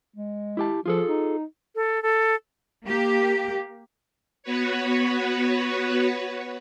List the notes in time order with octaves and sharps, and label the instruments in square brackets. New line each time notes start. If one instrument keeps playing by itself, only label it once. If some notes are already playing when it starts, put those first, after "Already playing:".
[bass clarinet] G#3
[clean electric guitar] E4 G4 A5
[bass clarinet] F3 [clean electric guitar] F4 G#4 A4
[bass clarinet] D#4
[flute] A4
A4
[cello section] A#3 G4
[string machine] B3 F#4 B4 C#5